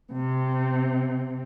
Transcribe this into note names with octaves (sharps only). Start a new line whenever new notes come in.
C3